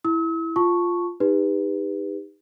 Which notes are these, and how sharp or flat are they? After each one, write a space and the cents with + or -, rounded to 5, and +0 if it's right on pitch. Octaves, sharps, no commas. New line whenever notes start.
E4 +0 E6 -45
F4 +0 A5 +0 C#6 +0
D#4 +0 G4 +35 B4 +0